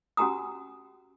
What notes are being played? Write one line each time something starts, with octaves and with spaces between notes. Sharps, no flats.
C#4 F#4 G4 G#5 A#5 D#6